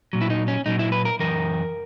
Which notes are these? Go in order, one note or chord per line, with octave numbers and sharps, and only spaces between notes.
A#2 F#3
E4
D#4
C#4
A#2 F#3 D#4
E4
B4
A#4
F#2 E3 A#4